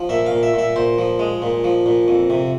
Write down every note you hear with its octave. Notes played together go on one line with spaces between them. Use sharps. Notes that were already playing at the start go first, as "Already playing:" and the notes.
Already playing: F3
A#2 E5
F5
A#2
E5
A#2 E5
A#2 C5
F3
G#3
A#2
F3
A#2
F2
C3